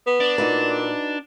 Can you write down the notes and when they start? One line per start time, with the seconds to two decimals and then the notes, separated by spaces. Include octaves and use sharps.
0.06 B3
0.20 D4
0.38 A#2 D#4 F#4 B4